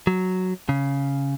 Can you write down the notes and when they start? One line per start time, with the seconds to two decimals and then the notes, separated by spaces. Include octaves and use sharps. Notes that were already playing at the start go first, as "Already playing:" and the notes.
0.07 F#3
0.69 C#3